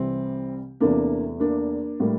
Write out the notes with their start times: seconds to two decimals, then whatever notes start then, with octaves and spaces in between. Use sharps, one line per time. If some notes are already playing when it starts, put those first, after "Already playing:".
Already playing: C2 C3 E3 G3 C4
0.80 E2 C3 E3 A3 A#3 D4
1.40 A#3 D4
2.00 A2 G3 A#3